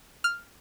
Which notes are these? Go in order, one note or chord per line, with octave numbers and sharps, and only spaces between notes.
F6